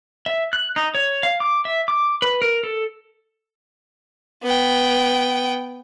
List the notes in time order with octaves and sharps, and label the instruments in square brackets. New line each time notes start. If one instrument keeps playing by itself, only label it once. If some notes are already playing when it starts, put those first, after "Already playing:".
[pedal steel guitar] E5
F#6
D#4
C#5
F5
D6
E5
D6
B4
A#4
A4
[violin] B3 G5